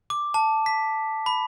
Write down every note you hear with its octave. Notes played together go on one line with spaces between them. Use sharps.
D6
A5
B6
B5